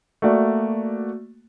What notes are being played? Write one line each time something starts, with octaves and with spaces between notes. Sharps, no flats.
A3 A#3 F#4 D5